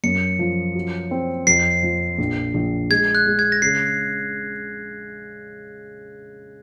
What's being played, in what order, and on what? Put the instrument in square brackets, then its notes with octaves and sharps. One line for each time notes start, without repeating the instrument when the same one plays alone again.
[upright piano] F#2 [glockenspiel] C#7
[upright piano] F3
F#3
C4
[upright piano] F2 [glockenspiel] C7
[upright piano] F3
A#1
A#1
[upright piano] G#3 [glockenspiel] G#6
[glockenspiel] F#6
[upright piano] G#3
[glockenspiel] G#6
A#6
[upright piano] C#3 [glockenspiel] C7